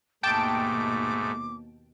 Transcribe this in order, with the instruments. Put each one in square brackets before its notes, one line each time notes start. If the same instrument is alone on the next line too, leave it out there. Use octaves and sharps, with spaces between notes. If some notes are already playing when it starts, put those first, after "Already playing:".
[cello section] D#2 B2 [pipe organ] G#2 A3 [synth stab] G5 A5 D7 [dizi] D6